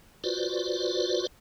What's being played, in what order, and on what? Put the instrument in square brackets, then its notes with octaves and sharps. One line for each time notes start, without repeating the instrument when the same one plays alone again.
[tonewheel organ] F4 F#4 B4 C5 D5